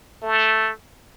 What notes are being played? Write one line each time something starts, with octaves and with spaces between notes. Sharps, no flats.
A3